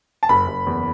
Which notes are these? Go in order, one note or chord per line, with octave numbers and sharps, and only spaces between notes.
A5
F#1 B5
F#1
E2